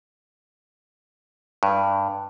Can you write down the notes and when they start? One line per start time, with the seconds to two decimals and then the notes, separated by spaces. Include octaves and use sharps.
1.63 G2